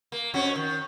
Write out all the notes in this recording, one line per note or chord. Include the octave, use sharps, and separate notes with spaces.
A#3
F2 C#4 F#4
D#3